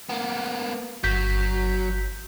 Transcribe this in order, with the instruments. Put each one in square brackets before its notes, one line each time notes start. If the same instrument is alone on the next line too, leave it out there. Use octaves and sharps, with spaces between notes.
[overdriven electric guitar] A#3 B3
[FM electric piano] G1 G6 B6 [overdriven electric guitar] F#3